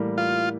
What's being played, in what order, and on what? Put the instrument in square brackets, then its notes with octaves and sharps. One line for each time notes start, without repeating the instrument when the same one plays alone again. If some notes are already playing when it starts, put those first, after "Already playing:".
Already playing: [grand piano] A2 E3 G3 A#3
[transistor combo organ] F4